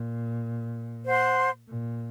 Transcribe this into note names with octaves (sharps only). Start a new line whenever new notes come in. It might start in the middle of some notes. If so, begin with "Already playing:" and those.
Already playing: A#2
C5 F#5 C6
A#2